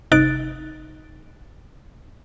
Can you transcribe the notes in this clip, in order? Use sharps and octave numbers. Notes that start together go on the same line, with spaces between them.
G1 C3 D#4 F#6 A6 D7